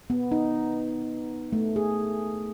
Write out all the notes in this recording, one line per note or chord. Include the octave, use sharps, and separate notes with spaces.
B3
D#4
A3
G#4